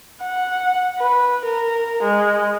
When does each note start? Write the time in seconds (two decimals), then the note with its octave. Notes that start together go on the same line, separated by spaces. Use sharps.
0.23 F#5
0.99 B4
1.45 A#4
2.03 G#3